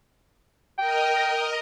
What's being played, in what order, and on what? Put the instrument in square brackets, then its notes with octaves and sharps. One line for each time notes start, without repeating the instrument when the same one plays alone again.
[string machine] A#4 D#5 [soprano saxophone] G5